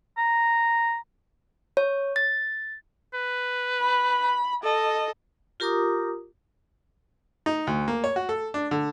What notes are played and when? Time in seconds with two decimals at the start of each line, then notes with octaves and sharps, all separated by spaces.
0.18 A#5
1.77 C#5
2.16 A6
3.14 B4
3.81 B5
4.63 A4 D#5
5.60 F4 G4 A#4 A#5 D6 D#6
7.46 D#4
7.67 D2
7.88 A#3
8.04 C#5
8.16 F#4
8.29 A4
8.54 D4
8.71 D3